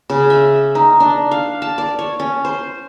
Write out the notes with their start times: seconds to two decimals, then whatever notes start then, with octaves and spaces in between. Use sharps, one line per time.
0.10 C#3
0.30 E5
0.75 D#4
1.00 D4
1.31 F5
1.62 A5
1.78 D5
1.99 C#5
2.20 C#4
2.45 C5